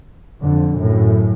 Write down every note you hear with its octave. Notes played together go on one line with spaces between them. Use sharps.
F2 D3
F#2 A2